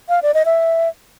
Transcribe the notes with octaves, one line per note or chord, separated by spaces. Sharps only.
F5
D5
D#5
E5